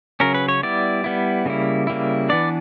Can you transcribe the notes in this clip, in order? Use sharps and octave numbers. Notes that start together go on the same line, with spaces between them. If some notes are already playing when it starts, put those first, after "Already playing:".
C#3 F#3 C#4 A#4
B4
C#5
G3 B3 E4 D5
G3 B3 E4
C#3 G3 A#3 E4
C#3 G3 A#3 E4
E3 B3 D4 D5